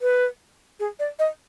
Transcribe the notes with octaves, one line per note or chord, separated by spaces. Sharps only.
B4
G#4
D5
D#5